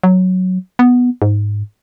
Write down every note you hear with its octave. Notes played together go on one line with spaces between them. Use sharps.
F#3
B3
G#2